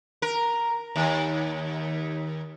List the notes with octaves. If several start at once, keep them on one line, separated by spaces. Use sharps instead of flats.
A#4
D#2